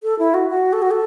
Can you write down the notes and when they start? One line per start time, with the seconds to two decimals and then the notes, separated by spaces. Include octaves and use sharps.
0.03 A4
0.19 E4
0.34 F#4
0.50 F#4
0.73 A4
0.82 F#4
0.91 A4